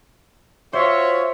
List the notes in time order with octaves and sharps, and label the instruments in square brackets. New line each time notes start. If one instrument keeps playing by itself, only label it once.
[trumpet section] F4 F#4 C#5 [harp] C5 [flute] E5